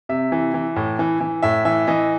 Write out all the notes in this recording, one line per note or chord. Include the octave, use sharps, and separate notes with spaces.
C3 E5
E3
E3
A2
E3
E3
A2 E5
E3 E5
E3 D#5